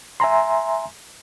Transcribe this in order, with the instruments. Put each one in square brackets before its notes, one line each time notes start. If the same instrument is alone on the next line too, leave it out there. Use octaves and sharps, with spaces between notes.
[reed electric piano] E5 G#5 A#5 C6